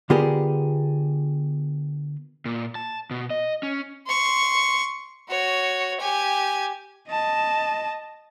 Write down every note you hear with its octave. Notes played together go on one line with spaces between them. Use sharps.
D3 B3 F4 G4 G#4 A#4
A#2
A5
B2
D#5
C#4
C6 C#6
F#4 C#5
G4 G#5
D#5 A5